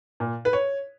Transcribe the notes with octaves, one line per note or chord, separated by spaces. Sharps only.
A#2
B4
C#5